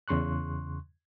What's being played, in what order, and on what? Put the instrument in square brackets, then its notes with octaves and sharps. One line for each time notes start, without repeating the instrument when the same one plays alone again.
[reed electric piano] E2 C#3 C6 C#6 F#6